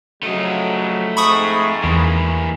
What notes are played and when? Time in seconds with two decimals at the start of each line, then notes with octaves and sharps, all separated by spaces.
0.23 C#3 F3 F#3 A3 D#5
1.17 F2 G#2 B5 C#6 D#6
1.84 E2 E3 A#3